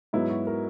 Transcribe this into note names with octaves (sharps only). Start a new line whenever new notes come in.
G#2 F#3 B3 E4
F#4
A#4